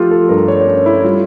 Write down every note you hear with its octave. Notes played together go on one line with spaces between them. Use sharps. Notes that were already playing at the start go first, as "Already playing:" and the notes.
Already playing: F3 A3 F4 G4 A4
A4
G2 A#4
C#5
C#4 A4
E4
G3 F4